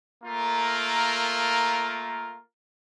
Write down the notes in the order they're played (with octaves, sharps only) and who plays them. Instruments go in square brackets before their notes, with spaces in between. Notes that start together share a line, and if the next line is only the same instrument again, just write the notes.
[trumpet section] A3 A#3 F4 A#4